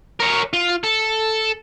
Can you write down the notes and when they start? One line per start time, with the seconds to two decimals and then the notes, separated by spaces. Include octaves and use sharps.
0.20 A#4 C#5
0.53 F4
0.84 A4